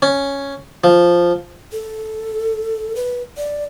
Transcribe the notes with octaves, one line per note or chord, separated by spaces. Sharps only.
C#4
F3
A4
B4
D5